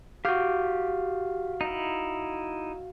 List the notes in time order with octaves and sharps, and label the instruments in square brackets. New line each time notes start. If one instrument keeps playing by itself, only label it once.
[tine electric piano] F#4 F5 [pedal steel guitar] G4 D6 G6
[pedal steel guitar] D#4 E4